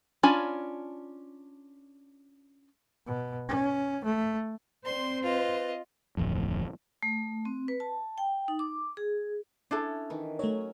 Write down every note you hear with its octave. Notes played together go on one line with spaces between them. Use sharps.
C#4 D4 F4 G#5 B5
B2
C#4
A3
C4 C5 D5 C6
F4 B4 D#5
D1 A1 F2
A3
C4
B4
A5
G5
D#4
D6
G#4
C#4 D4 E4 A4
D#3 E3
F#3 A3 C#4 C#5